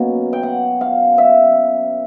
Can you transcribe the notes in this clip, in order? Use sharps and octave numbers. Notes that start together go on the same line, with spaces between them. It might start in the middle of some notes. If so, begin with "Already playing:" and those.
Already playing: B2 F#3 A#3 C#4
G5
F#5
F5
E5